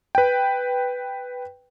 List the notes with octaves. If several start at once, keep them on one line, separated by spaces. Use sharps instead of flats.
B4 G5